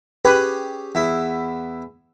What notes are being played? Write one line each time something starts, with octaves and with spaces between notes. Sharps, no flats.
C#4 G4 G#4 B4
E2 E4